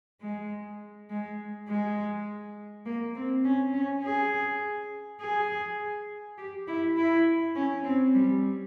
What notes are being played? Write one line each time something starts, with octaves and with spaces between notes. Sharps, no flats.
G#3
G#3
G#3
A#3
C4
C#4
C#4
G#4
G#4
G4
E4
E4
C#4
C4
G3